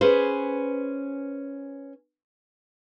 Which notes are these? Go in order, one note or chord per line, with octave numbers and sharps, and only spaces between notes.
C#4 G#4 B4 C5